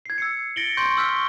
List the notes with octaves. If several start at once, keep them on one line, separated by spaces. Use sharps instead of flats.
G#6 C7
E6 C7 C#7
A6 A#6 C#7 D7 F#7 G7
C6 C#6 G6 D7
C6 E6 F6 G6 B6 G7
C#6 G7